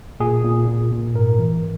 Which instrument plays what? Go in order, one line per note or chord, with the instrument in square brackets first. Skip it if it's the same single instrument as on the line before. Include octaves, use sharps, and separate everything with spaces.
[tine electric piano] A#2 G#4
A#2
A#2
A#2
G#2 A#4
E3